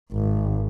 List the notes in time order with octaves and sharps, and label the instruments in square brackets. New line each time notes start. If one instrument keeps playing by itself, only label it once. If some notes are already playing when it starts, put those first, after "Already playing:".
[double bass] G#1